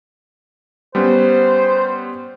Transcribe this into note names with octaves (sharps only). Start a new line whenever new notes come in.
G3 B3 C#4 C5